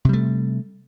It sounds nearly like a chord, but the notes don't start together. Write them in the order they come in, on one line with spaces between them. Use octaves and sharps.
C3 G3 A3